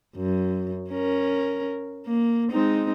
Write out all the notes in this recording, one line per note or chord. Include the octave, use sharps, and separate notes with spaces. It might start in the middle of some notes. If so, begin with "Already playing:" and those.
F#2
C#4 A#4
A#3
G#3 C4 D#4